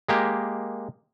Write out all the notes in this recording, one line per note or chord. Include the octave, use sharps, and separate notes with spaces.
G#3 A#3 G4